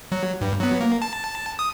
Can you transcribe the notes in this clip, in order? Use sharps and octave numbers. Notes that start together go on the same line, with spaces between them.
F#3
G2
F#3 B3
A#3
A5
D#6